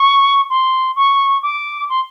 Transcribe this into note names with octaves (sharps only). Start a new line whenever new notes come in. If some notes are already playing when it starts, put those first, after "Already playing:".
Already playing: C#6
C6
C#6
D6
C6